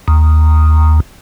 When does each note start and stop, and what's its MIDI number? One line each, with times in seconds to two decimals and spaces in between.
0.08 1.00 39